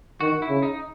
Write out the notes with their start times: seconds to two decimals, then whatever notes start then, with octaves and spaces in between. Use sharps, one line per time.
0.20 D#3 F#4
0.42 E4
0.49 C#3
0.62 D#4